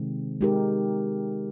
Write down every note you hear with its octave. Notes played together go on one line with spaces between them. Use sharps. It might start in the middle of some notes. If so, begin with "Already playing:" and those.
Already playing: C3 D#3 G#3 C4
G#3 D#4 G4 A#4